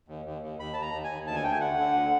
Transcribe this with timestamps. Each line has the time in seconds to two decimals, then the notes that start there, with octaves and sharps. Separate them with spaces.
0.08 D#2
0.25 D#2
0.42 D#2
0.59 D#2 B5
0.73 D#2 A5
0.82 A#5
0.93 D#2
1.04 G#5
1.10 D#2
1.26 D2 A5
1.35 G#5
1.43 A3 G5
1.52 G#5
1.60 D3 F#5
1.78 D3
1.94 D2